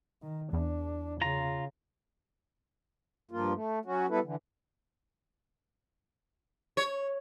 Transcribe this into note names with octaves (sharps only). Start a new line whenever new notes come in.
D#3
E2 D4
C#3 F4 A#5
G2 F3 A#3 F4
A3
F#3 C#4 F#4
G3 B3 E4 A4 B4
D3 E3
C#5